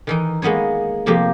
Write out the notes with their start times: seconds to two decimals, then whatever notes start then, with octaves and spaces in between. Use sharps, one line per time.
0.07 D#3 E3 D#4
0.42 G#3 A#3 B3 D#4 C#5
1.06 C3 F3 A3 A#3 G4